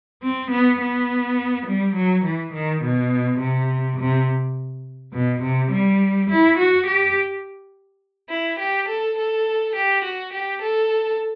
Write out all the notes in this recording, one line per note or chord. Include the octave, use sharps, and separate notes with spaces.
C4
B3
B3
G3
F#3
E3
D#3
B2
C3
C3
B2
C3
G3
E4
F#4
G4
E4
G4
A4
A4
G4
F#4
G4
A4